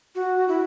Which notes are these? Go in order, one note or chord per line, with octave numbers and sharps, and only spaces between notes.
F#4
E4